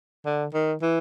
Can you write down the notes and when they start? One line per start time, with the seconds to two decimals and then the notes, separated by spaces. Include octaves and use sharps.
0.25 D3
0.54 D#3
0.82 E3